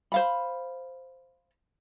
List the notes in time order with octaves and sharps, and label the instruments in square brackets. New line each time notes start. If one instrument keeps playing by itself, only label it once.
[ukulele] C5 F5 B5